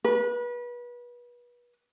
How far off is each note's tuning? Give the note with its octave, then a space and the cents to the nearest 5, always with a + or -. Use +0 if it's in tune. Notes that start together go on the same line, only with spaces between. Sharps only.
B4 -30